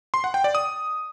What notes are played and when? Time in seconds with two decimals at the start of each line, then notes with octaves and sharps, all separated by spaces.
0.14 C6
0.24 F#5
0.34 G5
0.44 D5
0.55 D#6